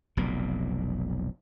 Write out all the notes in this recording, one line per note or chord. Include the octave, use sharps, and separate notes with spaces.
F1 B1 A#2